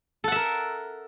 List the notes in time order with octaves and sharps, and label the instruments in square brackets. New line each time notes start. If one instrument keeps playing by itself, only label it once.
[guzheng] A4
F#5
E5
A#4